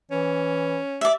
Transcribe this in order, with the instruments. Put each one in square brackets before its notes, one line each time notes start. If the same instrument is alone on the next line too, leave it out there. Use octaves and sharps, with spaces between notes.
[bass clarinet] E3 [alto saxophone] C#4
[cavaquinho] D5 E5